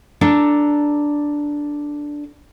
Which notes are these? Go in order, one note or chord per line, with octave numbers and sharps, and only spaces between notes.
D4 A4 A#5